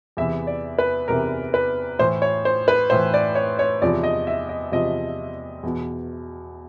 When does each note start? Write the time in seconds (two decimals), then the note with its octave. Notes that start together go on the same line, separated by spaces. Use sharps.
0.17 E2 C3 E3 E5
0.47 D5
0.78 B4
1.08 E2 C3 E3 A#4
1.54 B4
1.99 A2 E3 C5
2.22 C#5
2.45 C5
2.68 B4
2.90 A2 E3 C5
3.14 D5
3.35 C#5
3.59 C#5
3.82 E2 C3 F3 D5
4.04 D#5
4.27 E5
4.49 D#5
4.72 E2 C3 F3 D#5
5.63 E2 B2